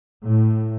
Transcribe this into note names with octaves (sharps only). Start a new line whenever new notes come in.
A2